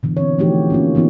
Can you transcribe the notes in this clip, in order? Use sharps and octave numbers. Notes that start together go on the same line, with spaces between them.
B2 D3 E3
C4 C#5
E3 F3 A3 D#4 F#4 G4
A#3 C#4 F4
D3 E3 B3 D#4 F4